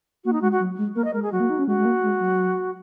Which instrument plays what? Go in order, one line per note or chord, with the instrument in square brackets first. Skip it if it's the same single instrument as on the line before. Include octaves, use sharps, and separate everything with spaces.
[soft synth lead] A#3 [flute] F#4
[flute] D#4
[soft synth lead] G#3 [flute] F#4
[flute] F#4
[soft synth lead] F#3
G#3
[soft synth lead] A#3 [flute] A#4
[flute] D#5
[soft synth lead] G#3 [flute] A#4
[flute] G#4
[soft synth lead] F#3 [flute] F#4
[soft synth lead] A#3
D#4
C#4
[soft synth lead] G#3 [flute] F#4
[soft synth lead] G#3
A#3
G#3
F#3